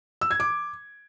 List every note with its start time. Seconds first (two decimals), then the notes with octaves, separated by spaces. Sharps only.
0.21 E6
0.31 G#6
0.40 D6